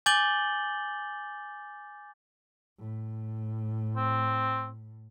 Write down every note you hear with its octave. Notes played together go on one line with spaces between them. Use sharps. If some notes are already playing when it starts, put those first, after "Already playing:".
G#5 D6 G6 A6 F#7 G7
A2
C4